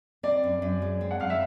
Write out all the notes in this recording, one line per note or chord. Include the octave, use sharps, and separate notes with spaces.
C4 D5
F#2
F#2
G#3
C4
F#5
F#2 F5
E5